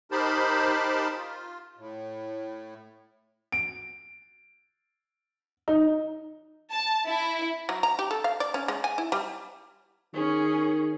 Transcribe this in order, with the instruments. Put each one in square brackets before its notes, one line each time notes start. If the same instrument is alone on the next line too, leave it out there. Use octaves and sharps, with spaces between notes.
[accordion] D#4 G4 A#4 C5 A5 B5
F4
A2
[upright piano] D7
D#4
[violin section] A5
E4
[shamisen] F#3
A#5
G4
A4
F5
D5
C#4
G#3
G#5
E4
G3
[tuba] D#3 [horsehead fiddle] C#4 G#4